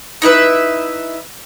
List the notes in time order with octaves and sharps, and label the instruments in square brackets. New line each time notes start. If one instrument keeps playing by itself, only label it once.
[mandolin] D#4 E4 B4 E5